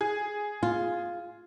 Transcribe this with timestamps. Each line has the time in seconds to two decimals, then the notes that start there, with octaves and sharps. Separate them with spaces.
0.01 G#4
0.63 F4